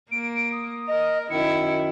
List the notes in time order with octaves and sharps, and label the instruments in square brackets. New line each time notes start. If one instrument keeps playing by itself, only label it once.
[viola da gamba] A#3 [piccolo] D7
[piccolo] D#6
[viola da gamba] A#4 [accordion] D#5
[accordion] F#2 D#3 [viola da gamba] E4 [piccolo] C#7